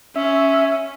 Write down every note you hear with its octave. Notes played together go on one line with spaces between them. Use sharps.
C#4 E5